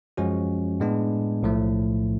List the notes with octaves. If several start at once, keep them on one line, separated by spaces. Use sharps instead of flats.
F#2 F3 G#3 C#4 F#4
A2 G#3 B3 D4
B1 A2 F3 A3